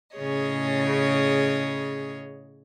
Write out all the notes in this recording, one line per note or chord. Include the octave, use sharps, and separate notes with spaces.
A2 C#3 G#4 C#5 D#5